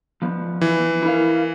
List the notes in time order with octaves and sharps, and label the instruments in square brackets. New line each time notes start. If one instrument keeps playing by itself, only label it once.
[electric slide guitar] F3 B3
[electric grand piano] E3
[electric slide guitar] E4 A#4 F5